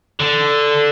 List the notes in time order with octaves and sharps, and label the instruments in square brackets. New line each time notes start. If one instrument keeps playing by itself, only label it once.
[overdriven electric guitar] D3